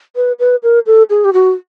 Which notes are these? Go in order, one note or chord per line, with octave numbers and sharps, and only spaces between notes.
B4
B4
A#4
A4
G#4
G4
F#4